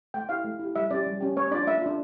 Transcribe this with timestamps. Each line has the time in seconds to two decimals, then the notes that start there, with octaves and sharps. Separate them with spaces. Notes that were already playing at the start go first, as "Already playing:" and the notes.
0.14 A3 G5
0.29 E4 G4 F5
0.45 A3
0.59 E4 G4
0.76 G3 E5
0.91 C#4 G4 D5
1.06 G3
1.21 C#4 G4
1.36 A#3 C#5
1.51 D4 F4 D5
1.67 A#3 E5
1.82 D4 F4